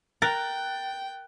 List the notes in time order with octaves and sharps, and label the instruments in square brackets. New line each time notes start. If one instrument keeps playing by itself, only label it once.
[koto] A#4 [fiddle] G5 [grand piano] F#6 A6